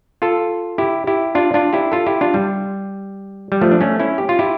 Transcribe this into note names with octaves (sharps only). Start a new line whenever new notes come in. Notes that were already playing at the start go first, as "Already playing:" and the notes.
F4 A4
E4 G4
E4 G4
D4 F4
D4 F4
E4 G4
F4 A4
E4 G4
D4 F4
G3
G3
F3 A3
D4
A3 C#4
C#4 E4
G4
F4
E4 G4